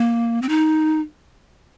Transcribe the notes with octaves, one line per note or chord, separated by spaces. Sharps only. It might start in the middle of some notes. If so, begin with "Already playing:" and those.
Already playing: A#3
C4
D#4